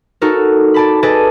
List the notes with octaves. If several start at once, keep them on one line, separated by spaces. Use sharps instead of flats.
D#4 F#4 A4 A#4
D5 A5 B5
G#4 A4 B4 D5 D#5 A5